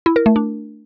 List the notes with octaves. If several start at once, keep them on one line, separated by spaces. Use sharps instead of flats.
E4
A#4
A3
D4